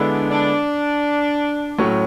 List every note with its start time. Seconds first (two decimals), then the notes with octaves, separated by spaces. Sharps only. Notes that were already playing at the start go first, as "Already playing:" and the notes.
Already playing: D3 G#3 B3 D4 E4 A4
0.30 D4
1.78 A2 F#3 A3 C#4